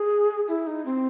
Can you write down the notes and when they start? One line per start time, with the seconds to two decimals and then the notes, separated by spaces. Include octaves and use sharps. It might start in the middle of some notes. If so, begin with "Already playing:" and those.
Already playing: G#4
0.48 E4
0.67 D#4
0.85 C4